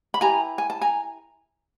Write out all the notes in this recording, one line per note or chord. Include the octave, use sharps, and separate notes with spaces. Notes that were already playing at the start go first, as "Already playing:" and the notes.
B5
E4 G4 B4 G#5 A#5
G#5
A5
G#5 A#5